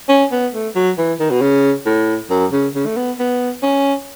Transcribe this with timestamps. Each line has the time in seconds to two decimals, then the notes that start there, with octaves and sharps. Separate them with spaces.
0.09 C#4
0.32 B3
0.54 A3
0.75 F#3
0.98 E3
1.20 D#3
1.31 B2
1.41 C#3
1.86 A2
2.30 F#2
2.52 C#3
2.75 C#3
2.86 A3
2.96 B3
3.19 B3
3.63 C#4